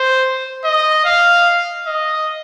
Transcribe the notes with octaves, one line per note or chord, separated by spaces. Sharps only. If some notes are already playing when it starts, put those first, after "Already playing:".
Already playing: C5
D#5
F5
D#5